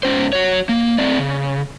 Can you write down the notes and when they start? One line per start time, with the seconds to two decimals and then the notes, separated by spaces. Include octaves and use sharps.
0.03 G#2 C#4 C5
0.33 F#4 C#5
0.69 A#3
0.98 A3 C4 D5
1.18 C#3